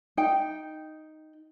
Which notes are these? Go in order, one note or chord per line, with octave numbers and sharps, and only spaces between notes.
D#4 G5